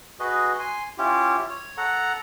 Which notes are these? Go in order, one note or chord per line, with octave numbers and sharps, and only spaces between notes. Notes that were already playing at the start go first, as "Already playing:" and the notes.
F#4 G#4 B4 D#5
G#5 C6
C#4 E4 F4 G4
C#5
A4 F#5 A#5